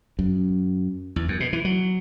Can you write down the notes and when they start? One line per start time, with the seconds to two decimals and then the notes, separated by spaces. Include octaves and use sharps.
0.19 F#2
1.16 E2
1.28 F#2
1.40 B2
1.53 E3
1.65 F#3